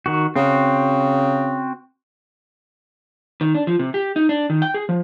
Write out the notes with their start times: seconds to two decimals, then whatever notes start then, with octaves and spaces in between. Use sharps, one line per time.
0.06 D#3 F#4
0.36 C#3 C4 F#4
3.41 D#3
3.55 D4
3.67 F3
3.79 C3
3.94 G4
4.16 D#4
4.29 D4
4.50 D#3
4.62 G5
4.74 G#4
4.89 F3